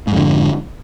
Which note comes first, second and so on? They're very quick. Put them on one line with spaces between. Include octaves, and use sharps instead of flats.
G#2 F2 D3